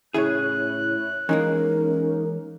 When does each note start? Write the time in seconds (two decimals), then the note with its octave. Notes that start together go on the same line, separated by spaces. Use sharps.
0.14 A2 C#3 E4 G#4 C#5 F#6
1.29 E3 G#3 A#3 C#4 D#4 A#4